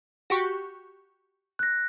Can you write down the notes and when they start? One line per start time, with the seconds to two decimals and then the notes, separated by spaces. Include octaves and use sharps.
0.30 F#4 G4 C#6
1.59 F#6 A#6